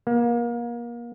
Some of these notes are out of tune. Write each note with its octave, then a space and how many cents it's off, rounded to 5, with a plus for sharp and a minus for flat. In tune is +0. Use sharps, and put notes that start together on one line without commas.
A#3 +30